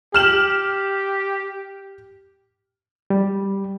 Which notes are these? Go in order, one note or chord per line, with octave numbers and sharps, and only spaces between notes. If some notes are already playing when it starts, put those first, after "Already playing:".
G4 F6 E7 F#7
G3